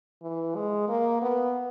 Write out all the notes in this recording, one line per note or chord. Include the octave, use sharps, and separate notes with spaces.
E3
G#3
A#3
B3